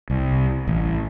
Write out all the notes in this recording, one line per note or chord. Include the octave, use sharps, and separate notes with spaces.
C2
A1